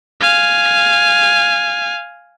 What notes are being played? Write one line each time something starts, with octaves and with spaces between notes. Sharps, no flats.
F5 G#5